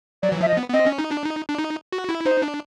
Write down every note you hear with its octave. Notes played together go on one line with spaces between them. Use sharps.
F#3 D5
E3
F3 E5
D#5
B3
B3
C4 D#5
C#4
D#4
D4
D#4
D4
D#4
F#4
E4
D#4 C5
D4